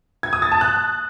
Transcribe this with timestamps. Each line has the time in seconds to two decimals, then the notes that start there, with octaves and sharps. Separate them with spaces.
0.23 G#6
0.33 D#6
0.42 A6
0.52 A5
0.61 F#6